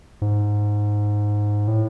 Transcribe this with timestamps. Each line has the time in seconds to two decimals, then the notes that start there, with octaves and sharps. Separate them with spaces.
0.22 G#2
1.68 A2